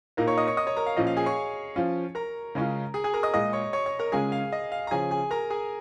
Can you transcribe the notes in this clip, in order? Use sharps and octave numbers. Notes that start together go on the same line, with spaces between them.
A#2 A#3 D#4 A#4 A#5
C#5 C#6
D#5 D#6
C#5 C#6
D#5 D#6
C#5 C#6
A#4 A#5
F5
A#2 F3 C#4 D#5
F5
G#4 G#5
C#5 C#6
F3 C#4 F4
A#4 A#5
C#3 G#3 C#4 F4
G#4 G#5
G#4 G#5
A#4 A#5
D#5 D#6
A#2 G#3 F4 D#5 D#6
C#5 C#6
C#5 C#6
C#5 C#6
A#4 A#5
C#3 G#3 C#4 F4 G#4 G#5
F5
D#5
F5
A#5
C#3 F3 C#4 G#4 G#5
G#4 G#5
A#4 A#5
G#4 G#5